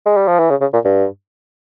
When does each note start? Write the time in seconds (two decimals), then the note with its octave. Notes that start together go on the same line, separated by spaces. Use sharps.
0.06 G#3
0.17 G3
0.28 F3
0.39 E3
0.50 C#3
0.61 C#3
0.73 A#2
0.85 G2